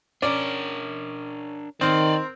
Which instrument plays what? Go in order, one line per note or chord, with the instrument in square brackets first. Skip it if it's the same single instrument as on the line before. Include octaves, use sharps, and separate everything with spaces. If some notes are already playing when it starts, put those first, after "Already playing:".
[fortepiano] C#4 D5 [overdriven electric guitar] D4 A#4
[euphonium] D#3 [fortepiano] C4 A#4 C5 [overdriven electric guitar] D5 D#5